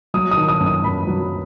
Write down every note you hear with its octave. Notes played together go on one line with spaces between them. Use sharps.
F#3 D#6
D#6
D#3
D#6
F#2
D#6
F#2 B5
F#3